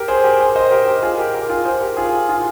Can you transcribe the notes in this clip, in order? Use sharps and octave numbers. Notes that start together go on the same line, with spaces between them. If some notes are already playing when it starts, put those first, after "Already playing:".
Already playing: G4 A#4
G#4 C5
G4 A#4
G#4 C5
C5 D#5
G4 A#4
G4 A#4
F4 G#4
G4 A#4
G4 A#4
F4 G#4
G#4 C5
G4 A#4
F4 G#4
F4 G#4